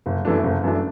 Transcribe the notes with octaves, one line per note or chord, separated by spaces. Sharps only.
F#1
F#2 E3 A3 D4
F#1
F#2 E3 A3 D4